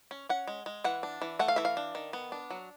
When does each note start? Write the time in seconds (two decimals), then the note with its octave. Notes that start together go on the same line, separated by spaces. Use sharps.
0.11 C#4
0.29 C#4 F#5
0.47 G#3
0.66 G#3
0.84 E3 F#5
1.03 D4
1.22 E3
1.39 A3 F#5
1.48 F5
1.56 E3 E5
1.65 F5
1.77 D4
1.95 D#3
2.13 B3
2.32 D4
2.50 F#3